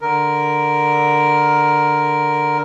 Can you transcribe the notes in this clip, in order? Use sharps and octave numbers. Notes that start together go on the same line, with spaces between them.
D3 A#4